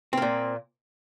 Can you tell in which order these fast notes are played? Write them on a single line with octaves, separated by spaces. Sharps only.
C4 A#3 A#2